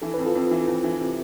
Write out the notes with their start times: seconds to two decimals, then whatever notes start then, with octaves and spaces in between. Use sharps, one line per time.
0.02 E3 A4
0.14 F2 B4
0.26 F4 A4
0.35 F2
0.51 E3
0.67 F2
0.84 E3
1.01 C3